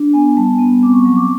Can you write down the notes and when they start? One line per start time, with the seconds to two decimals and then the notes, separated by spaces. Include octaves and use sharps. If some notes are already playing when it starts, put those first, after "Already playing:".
Already playing: D4
0.13 B3 G#5
0.37 G3 A5
0.59 B3
0.83 C4 D6
0.93 C#6
1.05 F#3 C#6
1.16 D6